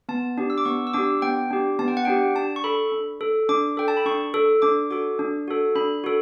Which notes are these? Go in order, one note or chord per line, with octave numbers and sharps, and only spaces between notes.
B3 A5
D4 G4
E6
D6
B3 C#6
E6
D4 G4 D6
B3 G5
D4 G4
B3 A5
G5
F#5
D4 G4 G5
D4 A5
C#6
A4 B5
D4
A4
D4 D6
A4 G5
A5
B5
D4 C#6
A4
D4 D6
F#4 A4 D6
D4
F#4 A4
D4 B5
F#4 A4